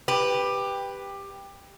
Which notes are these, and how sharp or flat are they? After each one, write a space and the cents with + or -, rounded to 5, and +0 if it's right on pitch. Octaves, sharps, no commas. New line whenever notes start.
G4 +15 B4 +0